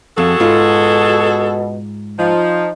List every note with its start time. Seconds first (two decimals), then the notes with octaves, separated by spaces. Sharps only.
0.18 F2 F#4 G#4 A4
0.40 G#2 B2 F4
2.19 F3 D#4